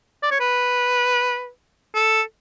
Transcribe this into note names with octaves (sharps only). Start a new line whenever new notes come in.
D5
C#5
B4
A4